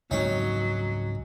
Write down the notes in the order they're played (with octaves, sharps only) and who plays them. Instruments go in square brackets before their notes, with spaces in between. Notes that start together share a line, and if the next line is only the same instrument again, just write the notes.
[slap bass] C#2 G#2 C4 [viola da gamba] F#3 [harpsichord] C#4 D#4